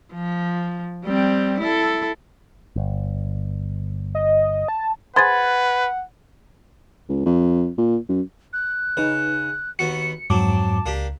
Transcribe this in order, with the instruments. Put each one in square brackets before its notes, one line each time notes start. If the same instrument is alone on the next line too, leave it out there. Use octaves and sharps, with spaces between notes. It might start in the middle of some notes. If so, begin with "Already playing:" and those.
[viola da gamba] F3
G3 C4
E4 A4
[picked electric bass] G1
[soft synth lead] D#5
A5
[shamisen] G#4 C5 [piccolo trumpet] B4 [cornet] F#5 [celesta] B5 G#6 A6
[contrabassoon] C#2
F2
A#2
F#2
[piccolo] F#6
[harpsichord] C#3 [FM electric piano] D#4 B4
[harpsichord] D#2 B3 F#4 [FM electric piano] C#7
[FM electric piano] F2 G#2 D6 [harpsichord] F#3 C4 [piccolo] A5
[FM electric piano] C#2 [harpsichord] A#3 D4 G4